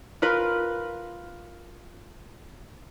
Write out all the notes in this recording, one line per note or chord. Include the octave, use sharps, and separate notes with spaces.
F4 A#4 B4